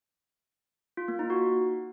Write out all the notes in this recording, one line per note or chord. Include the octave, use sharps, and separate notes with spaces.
F4
A#3
D#4
F#4